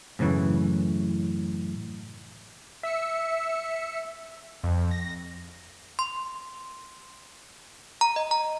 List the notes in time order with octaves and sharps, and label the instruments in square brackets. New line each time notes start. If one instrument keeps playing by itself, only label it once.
[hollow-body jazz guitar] F#2 A2 C#3 E3
[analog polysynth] E5 E6 C#7
F2
A#6
[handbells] C6
A#5
D#5
A#5